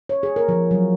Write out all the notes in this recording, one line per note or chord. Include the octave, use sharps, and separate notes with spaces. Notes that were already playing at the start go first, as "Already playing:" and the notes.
C#5
G#4
A#4
F3
F#3